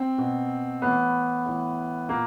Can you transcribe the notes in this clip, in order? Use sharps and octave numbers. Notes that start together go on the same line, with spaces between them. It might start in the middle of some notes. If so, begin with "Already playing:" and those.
Already playing: C4
B2
A2 E3 B3
A2 E3
A#2 A#3